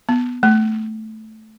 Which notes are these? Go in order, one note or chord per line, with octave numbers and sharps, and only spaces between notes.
B3
A3